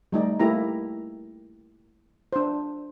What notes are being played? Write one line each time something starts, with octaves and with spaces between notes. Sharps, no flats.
G3 A3 D#4 D5
A3 A#3 E4 G4 A#5
D4 C5